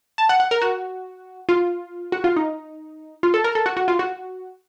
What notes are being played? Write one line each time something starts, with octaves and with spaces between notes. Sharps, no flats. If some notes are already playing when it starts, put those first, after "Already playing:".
A5
F#5
F#5
A#4
F#4
F4
F#4
F4
D#4
F4
A4
A#4
A4
F#4
F#4
F4
F#4